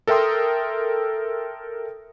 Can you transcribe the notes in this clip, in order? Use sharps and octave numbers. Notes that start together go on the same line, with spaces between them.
A4 A#4 E5 G5 C6 D#6